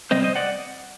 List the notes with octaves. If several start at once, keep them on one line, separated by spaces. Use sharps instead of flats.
C3 G3 C4 C5 D#5
C5 D#5
D5 F#5